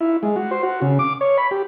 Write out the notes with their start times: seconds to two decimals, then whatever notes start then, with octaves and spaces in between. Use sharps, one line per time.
0.01 E4
0.23 G#3
0.36 F#4
0.51 C5
0.63 F#4
0.82 C#3
0.99 D6
1.21 C#5
1.38 B5
1.51 G4